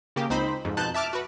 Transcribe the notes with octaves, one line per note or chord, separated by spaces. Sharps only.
C#3 A#3 G4
C#2 C4 D#4 C5 B5
F2 G#2
F2 B2 D#4 A5 F#6 G6
E5 A5 D6 F6
F#4 B4